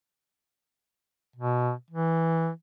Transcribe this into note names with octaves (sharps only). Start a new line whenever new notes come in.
B2
E3